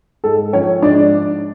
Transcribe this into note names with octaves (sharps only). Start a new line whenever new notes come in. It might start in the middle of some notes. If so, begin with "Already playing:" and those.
G#2 A4
F3 C#4 C#5
G#2 D4 D5